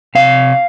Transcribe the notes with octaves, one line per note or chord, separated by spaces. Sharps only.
C3 F5